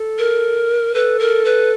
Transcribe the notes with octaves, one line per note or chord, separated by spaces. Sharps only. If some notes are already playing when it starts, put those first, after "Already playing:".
Already playing: A4
A#4
A4 B4
A#4
B4